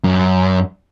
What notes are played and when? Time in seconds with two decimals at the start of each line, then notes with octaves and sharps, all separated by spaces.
0.04 F#2